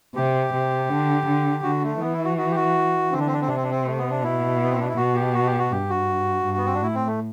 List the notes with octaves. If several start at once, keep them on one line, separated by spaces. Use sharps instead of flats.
C3 G4
C3
D3
D3
D3 F#4
A3
E3 B3
E4
F#4
F#4
G4
F#4
D3 C4
D4
C4
D4
C4
C3 D4
C4
D4
C4
A3
B3
D4
B2 E4
B3
C4
D4
E4
B2 F#4
G4
F#4
G4
F#4
G2 G4
F#4
G2
B3
C4
D4
A2 E4
C4
A3